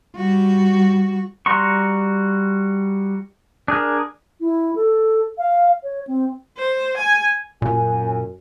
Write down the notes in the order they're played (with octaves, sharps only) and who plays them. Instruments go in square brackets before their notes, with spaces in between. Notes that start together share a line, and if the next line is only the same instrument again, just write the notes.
[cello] G3 F#4
[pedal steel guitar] G3 F#4 A#5 C6 C#6
D4 G#4 A#4
[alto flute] E4
A4
F5
C#5
C4
[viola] C5
G#5
[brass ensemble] F#2 [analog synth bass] A#2 [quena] G#5